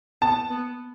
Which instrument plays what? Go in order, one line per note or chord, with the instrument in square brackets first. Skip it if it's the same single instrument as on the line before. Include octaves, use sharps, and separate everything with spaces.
[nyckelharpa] B3 [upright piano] A5
[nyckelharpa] B3